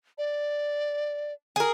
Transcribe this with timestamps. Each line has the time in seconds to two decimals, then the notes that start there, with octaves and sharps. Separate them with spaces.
0.18 D5
1.56 G#4 A#4